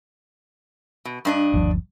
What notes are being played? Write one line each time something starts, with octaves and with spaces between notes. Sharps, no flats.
B2
G2 D4 D#5
G1 D#2 F3